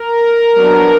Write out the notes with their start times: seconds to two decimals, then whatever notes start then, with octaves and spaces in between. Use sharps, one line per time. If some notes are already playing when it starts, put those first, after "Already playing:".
Already playing: A#4
0.57 F#3 B3 D4